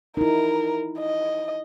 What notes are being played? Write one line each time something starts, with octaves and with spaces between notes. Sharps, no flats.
D#4 E4 A#4
D#5